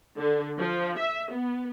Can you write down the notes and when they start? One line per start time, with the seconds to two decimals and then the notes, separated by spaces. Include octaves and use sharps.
0.18 D3
0.59 F3
0.99 E5
1.33 B3